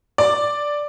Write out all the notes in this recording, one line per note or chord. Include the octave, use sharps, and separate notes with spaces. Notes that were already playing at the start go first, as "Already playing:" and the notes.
D5